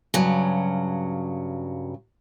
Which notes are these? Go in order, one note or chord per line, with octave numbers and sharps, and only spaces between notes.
G2 C#3 F#3